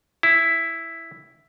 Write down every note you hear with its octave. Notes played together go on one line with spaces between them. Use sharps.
E4